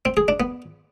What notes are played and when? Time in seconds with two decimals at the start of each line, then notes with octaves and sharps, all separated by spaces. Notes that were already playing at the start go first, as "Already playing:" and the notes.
0.05 C4
0.17 G#4
0.28 D4
0.40 B3